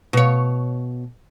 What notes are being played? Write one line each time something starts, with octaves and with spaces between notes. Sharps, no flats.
B2 C#5